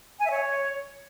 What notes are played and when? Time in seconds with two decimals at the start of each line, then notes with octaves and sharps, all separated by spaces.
0.19 G#5
0.25 E5
0.30 C#5